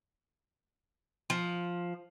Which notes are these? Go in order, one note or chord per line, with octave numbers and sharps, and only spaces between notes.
F3